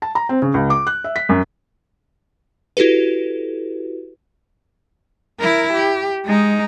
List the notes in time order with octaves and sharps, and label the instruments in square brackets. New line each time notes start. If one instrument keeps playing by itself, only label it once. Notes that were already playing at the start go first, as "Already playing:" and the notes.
[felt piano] A5
A#5
C4
C#3
C#2
D6
F#6
E5
B6
F#2
[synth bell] E4 F#4 G4 A4 B4
[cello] E4 A#4
G4
G#3 D#4